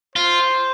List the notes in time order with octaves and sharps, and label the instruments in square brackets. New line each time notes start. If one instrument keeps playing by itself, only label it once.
[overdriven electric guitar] F4 [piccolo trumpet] C5